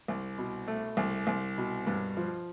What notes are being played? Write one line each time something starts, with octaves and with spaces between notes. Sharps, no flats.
C2
B2
A3
C2
C2
B2
G2
F3